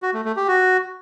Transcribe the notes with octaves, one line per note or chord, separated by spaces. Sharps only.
F#4
A3
A3
G4
F#4